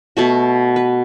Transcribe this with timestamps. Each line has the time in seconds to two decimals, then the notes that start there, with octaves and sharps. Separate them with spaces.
0.17 B2 A3 F#4
0.76 B4